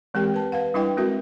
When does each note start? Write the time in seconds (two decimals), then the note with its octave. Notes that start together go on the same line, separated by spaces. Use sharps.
0.14 E3 G#3 C4 G4 A#4 G5
0.34 B4 A5
0.52 B4 F5 F#5
0.74 G3 D4 E4 B4 D#5 G5
0.97 G#3 C4 F#4 A#4 E5